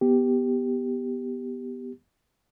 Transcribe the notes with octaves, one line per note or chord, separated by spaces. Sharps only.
B3 G4